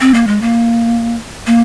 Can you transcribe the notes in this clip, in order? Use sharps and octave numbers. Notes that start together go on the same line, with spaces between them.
C4
A#3
G#3
A#3
A#3